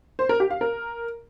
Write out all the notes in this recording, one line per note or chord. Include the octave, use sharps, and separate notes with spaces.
C5
A#4
G4
F5
A#4